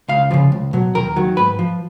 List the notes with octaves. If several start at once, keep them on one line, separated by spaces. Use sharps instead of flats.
C#2 F5
C#3 F3
C#2
B2 F#3
D#2 A#4
D#3 F#3
G#2 B4
F3